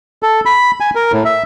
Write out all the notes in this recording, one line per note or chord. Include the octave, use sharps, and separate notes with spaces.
A4
B5
G#5
A#4
A2
E5